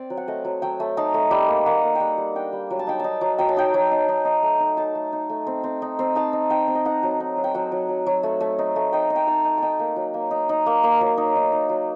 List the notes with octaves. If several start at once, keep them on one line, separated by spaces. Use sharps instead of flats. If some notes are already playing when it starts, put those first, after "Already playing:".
Already playing: C4 D5
F#3
F#5
A3 D#5
F#3
F#3 G5
A3
D#4 A5
A3
G3 G5
A#3
A#3 F#5
A#3
G3 F#5 G5
G3
D4 G5
G3
F#3
A5
D#4 G5
D#4 A5
F#3
F#3 G5
A5
D#4 G5
F#3
D#4
D#4
D#4
A3
D#4
D#4 A5
A3
D#4
A3
C4
C4
D#4
C4
D#4 A5
D#4
D#4 G5
C4
D#5
D#4 F#5
F#3
D#4
F#3
G5
F#3 F#5
F#3
F#3
F#3
A3
A3
D#4
A3
D#4 G5
D#4
G5
D#4 A5
D#4
D#4 G5 A5
A#3
F#3
A#3
D#4
D#4
A#3
A#3
F#3
D#4
D#4
D#4
F#3